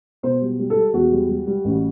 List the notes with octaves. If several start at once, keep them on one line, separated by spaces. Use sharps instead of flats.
B2 C5
G3
G3
A4
G3
E2 F#4
G3
G3
G3
A1